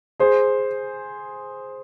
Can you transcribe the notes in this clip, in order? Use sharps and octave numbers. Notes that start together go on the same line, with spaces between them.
G#4 C5